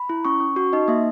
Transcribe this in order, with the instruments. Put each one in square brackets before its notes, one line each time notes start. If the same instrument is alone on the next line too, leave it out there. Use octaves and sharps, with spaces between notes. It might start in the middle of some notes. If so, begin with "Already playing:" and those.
Already playing: [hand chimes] B5
E4
C#4 C#6
C#4
F#4 C#6
D#4 D#5
A#3 E5